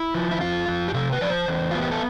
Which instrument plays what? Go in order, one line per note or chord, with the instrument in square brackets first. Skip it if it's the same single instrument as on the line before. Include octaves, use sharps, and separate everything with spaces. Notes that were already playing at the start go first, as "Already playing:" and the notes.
Already playing: [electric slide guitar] E4
F3
E4
F2 F4
F2
G4
C3 A4
B4
F3 D5
C5
E2
B3 F4
G4
A4